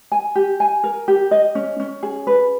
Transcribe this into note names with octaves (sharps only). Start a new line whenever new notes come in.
G#5
G4
G#5
A#4
G4
D#5
C#4
C#4
G#4
B4